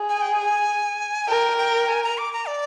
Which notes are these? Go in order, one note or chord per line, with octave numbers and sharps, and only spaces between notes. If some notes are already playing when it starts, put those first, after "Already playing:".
Already playing: G#4
G#5
G5
G#5
A#4 G5
G5
G#5
A#5
D6
A#5
D5